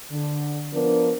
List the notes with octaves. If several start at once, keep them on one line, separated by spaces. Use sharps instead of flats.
D3
F3 B3 D4 A#4